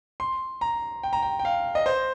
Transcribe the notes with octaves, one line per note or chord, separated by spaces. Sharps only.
C6
A#5
G5
A#5
G5
G5
F5
D#5
C5